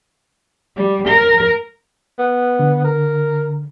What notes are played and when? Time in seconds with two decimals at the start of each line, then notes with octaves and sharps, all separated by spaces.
0.77 G3
1.08 A#4
2.18 B3
2.59 D3
2.85 A#4